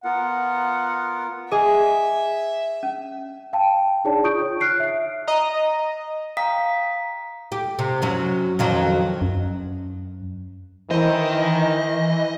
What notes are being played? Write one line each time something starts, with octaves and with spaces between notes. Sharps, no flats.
B3 F4 A#4 F#5
G#4 D#5 E5 G#5
C#4
F5 G5 A5
D4 D#4 G#4 C#5 D5 A5
F4 C#6 D#6 G6 D7
C#5
F6 F#6 C7 D7
E5
D#5 A#5
F5 G5 A#5 D#6 B6
G4
C3
F#2 F#3 C#4
F2 D#3 F#3
F#2
D#3 E3 E4 C5 D#5